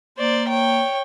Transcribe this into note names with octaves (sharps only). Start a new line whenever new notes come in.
A#3 C5 D5
C#5 G5